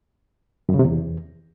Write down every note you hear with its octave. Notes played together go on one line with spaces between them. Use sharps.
F#2
C#3
C3
E2